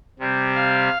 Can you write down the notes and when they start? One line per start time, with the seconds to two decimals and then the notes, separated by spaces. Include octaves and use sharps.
0.19 C3 G3 C4
0.55 F5